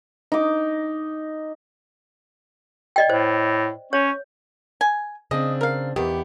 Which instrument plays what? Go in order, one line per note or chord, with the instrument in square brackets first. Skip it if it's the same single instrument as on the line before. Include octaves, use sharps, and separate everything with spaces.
[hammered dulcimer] D#4 D6
[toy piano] D5 D#5 G5
[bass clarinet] A2 [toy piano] C5
[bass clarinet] C#4 [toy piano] C#5
[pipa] G#5
[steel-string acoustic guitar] C#3 C4 D4 [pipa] D#5
[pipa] A#4 F5
[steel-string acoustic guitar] E2 B3 G4 [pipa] D#3